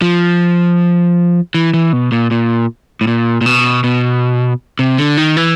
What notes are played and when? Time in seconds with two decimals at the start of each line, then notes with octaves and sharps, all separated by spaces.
0.02 F3
1.54 E3
1.74 E3
1.93 B2
2.12 A#2
2.31 A#2
3.01 A2
3.07 A#2
3.41 A#2
3.46 B2
3.84 B2
4.79 C3
4.98 D3
5.17 D#3
5.37 E3